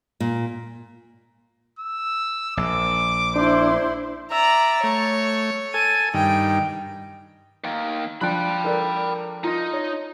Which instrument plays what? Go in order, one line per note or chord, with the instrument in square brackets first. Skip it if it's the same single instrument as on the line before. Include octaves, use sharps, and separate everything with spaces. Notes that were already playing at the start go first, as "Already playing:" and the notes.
[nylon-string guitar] A#2
[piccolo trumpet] E6
[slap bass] A#1 [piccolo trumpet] D6
[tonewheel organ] D4 [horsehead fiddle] E4 C5
[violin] D5 A#5 [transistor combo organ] E5
[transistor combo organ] A3 [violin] C#5
[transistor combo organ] A4 G#5 [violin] D#7
[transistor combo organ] G2 D#3 [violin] G5
[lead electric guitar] D#3 A#3
[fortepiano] F3 D4 [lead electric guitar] G5 B5 [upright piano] F#6
[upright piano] A4 A#4 D5
[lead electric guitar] D#4 D#5 [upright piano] F4
[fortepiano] C#5